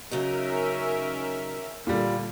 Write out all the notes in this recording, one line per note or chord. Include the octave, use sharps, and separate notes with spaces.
C#3 F#3 C#4 D#4 A#4 E5
A#2 D3 G3